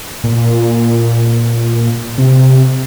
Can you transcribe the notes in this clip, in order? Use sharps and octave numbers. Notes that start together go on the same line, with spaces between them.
A#2
C3